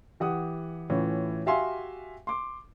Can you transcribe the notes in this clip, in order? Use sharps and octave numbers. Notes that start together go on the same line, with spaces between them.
E3 G4 F#5 D#6
A2 E3 C#4 F4
F#4 G4 E5 F5 G#5 C6
C6 D6